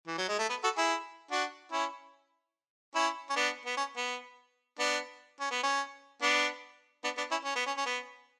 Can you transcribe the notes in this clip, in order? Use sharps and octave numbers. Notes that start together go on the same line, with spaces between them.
E3
F#3
G#3
A3
B3
F#4 A4
E4 G#4
D4 F#4
C#4 E4
C#4 E4
C#4
B3 D4
B3
C#4
B3
B3 D4
C#4
B3
C#4
B3 D4
B3 D4
B3 D4
C#4 E4
C#4
B3
C#4
C#4
B3